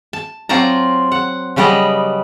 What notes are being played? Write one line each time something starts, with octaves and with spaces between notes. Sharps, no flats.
A5
F#3 C4 F4 D5 A5 A#5
F#5
C#3 F#3 G3 B3 D5 D#5